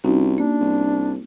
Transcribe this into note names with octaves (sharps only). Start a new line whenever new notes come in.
C2 C#4 D#4 F#4
A#3 D4
C2